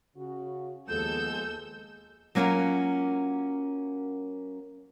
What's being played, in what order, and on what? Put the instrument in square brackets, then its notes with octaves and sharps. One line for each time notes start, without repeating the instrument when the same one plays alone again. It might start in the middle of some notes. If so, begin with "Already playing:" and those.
[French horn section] C#3 F#4
[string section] D#2 A4 E6 [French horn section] F3 G#3 B3 [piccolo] G6
[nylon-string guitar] F#3 A#3 C#4 F4 F#4 A#4